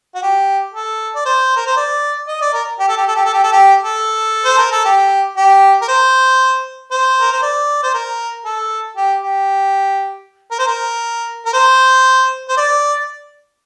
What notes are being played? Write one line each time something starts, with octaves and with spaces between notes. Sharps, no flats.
F#4
G4
A4
D5
C5
A#4
C5
D5
D#5
D5
A#4
G4
A4
G4
A4
G4
A4
G4
A4
G4
A4
C5
A#4
A4
G4
G4
A#4
C5
C5
A#4
C5
D5
C5
A#4
A4
G4
G4
A#4
C5
A#4
A#4
C5
C5
D5